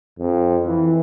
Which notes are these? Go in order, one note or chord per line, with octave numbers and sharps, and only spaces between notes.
F2
E3